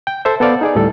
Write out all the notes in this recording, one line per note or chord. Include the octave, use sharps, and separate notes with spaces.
G5
A4 C5 E5
B3 A4 C5 D5 F5
D#4 G#4 D5
D2 A2 G3 A4